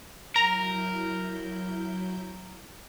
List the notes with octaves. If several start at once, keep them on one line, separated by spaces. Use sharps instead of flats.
F#3 E4 A#4 A#5 G6